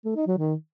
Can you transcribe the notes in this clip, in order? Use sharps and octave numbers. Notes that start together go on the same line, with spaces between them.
A3
D#4
F#3
D#3